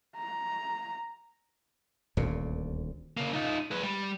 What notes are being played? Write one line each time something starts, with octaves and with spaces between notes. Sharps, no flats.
A#5
D#1 D2 A#2
C#3 A#3
D#4 F4
G#4 B4
G3